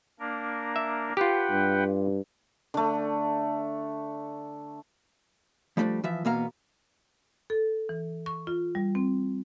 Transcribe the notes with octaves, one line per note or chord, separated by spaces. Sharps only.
A#3 D4 A#4
E5
F4 G4 B4 F#5 G5
G2
D3 A3
F3 G3 A3 C#4 D4
E3 F3 E5
E2 B2 A#3 B3 F5 A#5
A4
E3
C#6
F4
G3
C4